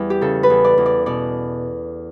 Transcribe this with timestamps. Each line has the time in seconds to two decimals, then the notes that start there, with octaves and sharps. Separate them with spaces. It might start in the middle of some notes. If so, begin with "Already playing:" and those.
Already playing: E2 G3 E4
0.10 G4
0.21 C#3 A4
0.43 B4
0.50 E2
0.64 D5
0.78 E2
0.86 D5
1.06 B2 D5